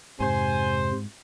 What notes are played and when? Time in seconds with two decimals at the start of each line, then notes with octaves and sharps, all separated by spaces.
0.20 F2 G#2 C3 C5 G#5